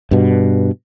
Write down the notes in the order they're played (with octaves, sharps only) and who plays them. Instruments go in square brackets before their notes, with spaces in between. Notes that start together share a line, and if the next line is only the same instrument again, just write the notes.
[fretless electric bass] G2 B2